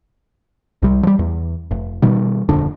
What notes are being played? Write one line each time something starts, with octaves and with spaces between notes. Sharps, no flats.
C2 G3
F3 G3
E2
F1
B2 D#3 G3
D#1 F2 D3 D4